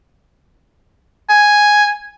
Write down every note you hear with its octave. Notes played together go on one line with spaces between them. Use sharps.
G#5